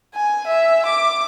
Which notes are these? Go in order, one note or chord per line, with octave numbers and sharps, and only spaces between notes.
G#5
E5
D6